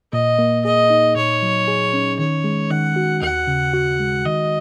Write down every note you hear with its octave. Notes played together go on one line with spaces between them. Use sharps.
A#2 D#5
A#3
G#4 D#5
D#4
A#2 C#5
F#3
G#4
C#4
D#3 C#5
G#3
D#3 F#5
F#4
D#2 F#5
C#3
F#4
G#3
D#3 D#5